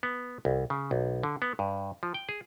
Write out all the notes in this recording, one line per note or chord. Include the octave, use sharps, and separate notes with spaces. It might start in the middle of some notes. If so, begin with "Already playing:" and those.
B3
C2
C#3
B1
D3
B3
G2
F3
G5
G#4